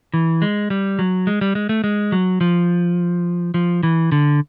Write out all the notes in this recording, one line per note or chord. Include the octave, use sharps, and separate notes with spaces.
E3
G#3
G3
F#3
G#3
G3
G#3
A3
G#3
F#3
F3
F3
E3
D3